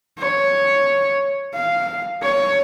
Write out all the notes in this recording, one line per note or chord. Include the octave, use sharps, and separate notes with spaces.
C#5
F5
C#5